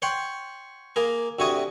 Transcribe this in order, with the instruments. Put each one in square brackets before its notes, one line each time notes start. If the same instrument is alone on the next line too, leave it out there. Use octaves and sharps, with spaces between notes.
[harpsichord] C#5 F#5 G5 C6
A#3 G#4 A#4
D2 C3 F#4 C#5 G#5 D#6